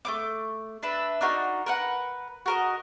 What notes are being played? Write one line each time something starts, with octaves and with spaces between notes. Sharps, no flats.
A3 C4 D6
D4 B4 E5
D4 D#4 F#4 A#4
A#4 B4 F#5
F#4 A#4 D#5